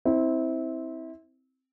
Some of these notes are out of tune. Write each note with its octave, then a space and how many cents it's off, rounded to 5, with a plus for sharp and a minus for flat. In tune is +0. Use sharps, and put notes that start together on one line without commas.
C4 +0 E4 -25